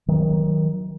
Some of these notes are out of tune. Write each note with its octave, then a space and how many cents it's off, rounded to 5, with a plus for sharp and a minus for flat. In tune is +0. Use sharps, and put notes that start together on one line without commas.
D#3 +15 F#3 -5